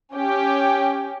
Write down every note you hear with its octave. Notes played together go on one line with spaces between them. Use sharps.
C#4 G4